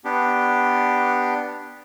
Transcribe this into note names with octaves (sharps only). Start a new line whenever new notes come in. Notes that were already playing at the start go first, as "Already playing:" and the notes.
B3 D4 G4